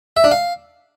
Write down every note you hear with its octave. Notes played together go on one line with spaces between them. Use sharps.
E5
D4
F5